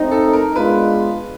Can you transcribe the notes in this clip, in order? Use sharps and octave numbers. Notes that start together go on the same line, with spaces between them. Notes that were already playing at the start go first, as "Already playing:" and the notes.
Already playing: A3 C4 D#4
A4
A#4
G#3 B3 D4 F4 B4